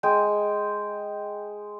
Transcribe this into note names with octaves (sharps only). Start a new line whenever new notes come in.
G#3 G5